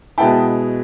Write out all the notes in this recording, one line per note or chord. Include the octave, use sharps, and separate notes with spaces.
B2 G#3 B3 E4 G5 A5